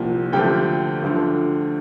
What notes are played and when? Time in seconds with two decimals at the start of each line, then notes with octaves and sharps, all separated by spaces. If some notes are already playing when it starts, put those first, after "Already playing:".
Already playing: C2 A#2 F3 G4
0.32 D2 D3 F3 G4 G5
1.02 D2 D3 F3